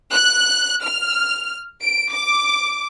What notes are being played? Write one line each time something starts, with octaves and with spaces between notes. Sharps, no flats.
F#6
F6
D7
D6